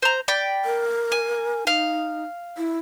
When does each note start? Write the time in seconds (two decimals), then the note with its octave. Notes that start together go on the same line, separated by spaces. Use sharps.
0.02 C5 A#5
0.28 D5 G5 B5
0.65 A#4
1.12 G#5
1.67 D#4 F5
2.57 E4